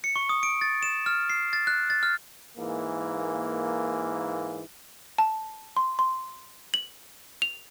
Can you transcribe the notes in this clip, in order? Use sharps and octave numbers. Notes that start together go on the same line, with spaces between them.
C#7
C#6
D#6
D7
A6
E7
F6
C7
A6
F#6
A6
F6
G#2 E3 A#3
A5
C6
C6
F#7
F7